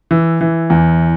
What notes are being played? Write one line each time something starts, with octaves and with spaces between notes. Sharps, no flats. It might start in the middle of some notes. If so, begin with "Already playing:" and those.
E3
E3
E2